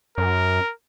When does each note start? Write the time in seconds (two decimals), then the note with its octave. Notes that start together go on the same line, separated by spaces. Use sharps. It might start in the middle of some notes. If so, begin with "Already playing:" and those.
0.18 F#2 A#4